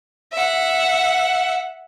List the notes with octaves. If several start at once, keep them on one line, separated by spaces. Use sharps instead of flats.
E5 F#5